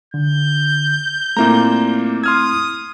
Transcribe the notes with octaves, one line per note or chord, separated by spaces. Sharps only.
D3 G6
A#2 A3 A#3 C4 E4 A#5
C6 D#6 F6 G#6